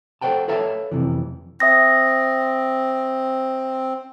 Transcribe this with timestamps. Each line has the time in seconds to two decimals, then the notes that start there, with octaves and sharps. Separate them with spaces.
0.21 A4 C5 F#5 G5 A5
0.48 A4 B4 C#5 E5 F5 A5
0.92 F2 C3 E3
1.60 C4 E5 D#6 A#6